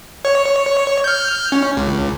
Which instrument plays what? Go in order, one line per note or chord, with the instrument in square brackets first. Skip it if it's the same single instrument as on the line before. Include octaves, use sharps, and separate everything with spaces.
[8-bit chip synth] C#5
F6 G6
C#4
C#2